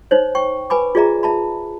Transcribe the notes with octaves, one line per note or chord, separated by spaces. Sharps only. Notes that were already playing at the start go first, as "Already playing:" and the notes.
D#4 C5 C#5
G5 C#6
B4 G#5 B5 D6
F4 G#4 D5 E5 A#5
E5 A5 B5